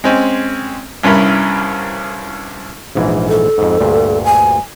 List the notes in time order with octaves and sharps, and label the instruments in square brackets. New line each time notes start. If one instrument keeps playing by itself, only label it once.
[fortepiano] G#3 C4 C#4
C2 G2 C#4 E4 A#4 B5
[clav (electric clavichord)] A#1 G#2 E3
[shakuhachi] A4
[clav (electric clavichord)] F2 G#2
D2 G2 A#2
[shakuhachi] G#5